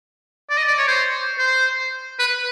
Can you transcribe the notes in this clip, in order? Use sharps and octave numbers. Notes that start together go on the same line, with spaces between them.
D5
D#5
D5
C#5
C5
C5
B4